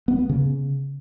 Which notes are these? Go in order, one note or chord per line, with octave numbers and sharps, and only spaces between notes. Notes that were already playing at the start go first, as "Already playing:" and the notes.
B3
B3
C#3